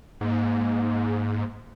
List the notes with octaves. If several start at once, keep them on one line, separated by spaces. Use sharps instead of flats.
G#2 A#3